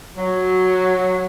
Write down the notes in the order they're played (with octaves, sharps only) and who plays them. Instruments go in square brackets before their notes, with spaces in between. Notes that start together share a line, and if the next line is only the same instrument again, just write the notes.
[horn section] F#3